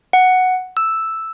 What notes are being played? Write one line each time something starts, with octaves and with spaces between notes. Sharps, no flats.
F#5
E6